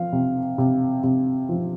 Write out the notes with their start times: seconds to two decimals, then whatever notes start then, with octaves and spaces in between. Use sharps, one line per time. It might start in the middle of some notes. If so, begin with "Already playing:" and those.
Already playing: F3 F5
0.13 C3
0.58 C3
1.03 C3
1.49 F3